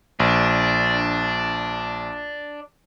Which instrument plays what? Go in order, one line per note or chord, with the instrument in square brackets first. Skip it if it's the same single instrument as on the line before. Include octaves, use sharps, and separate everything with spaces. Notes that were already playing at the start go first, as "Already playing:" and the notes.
[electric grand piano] A#1 [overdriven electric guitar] D4